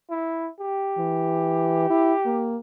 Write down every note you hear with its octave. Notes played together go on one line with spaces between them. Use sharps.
E4
G4
E3
E4
A#3